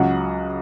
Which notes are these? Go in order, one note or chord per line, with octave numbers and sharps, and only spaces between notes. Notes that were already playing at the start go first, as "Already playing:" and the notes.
Already playing: C#2 C#3 F#3 F#5